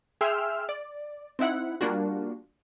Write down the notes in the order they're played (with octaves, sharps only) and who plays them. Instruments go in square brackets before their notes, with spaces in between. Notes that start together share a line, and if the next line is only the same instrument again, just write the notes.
[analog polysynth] G#4 E5 G5 C6 E6 F6
D5
C4 D#4 E4 F#5
G3 A#3 D4 F4 F#4